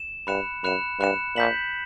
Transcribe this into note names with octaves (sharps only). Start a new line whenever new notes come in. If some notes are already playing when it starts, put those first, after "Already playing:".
Already playing: E7
G2 B5 F#6 C#7 E7
F#2 B5 F#6 C#7 E7
G2 B5 F#6 C#7 E7
A#2 G6 B6 F#7